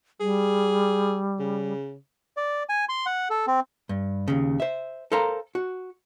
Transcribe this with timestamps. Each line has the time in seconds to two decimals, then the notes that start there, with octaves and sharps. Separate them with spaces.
0.20 G3 G#4
1.39 C#3
2.37 D5
2.69 G#5
2.89 C6
3.06 F#5
3.30 A4
3.47 C4
3.89 G2
4.28 D#2 C#3
4.60 C5 E5
5.12 A4 A#4 C5 F5 A#5
5.55 F#4